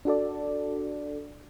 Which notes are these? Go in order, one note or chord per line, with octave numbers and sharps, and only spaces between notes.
D4 F#4 A4 D5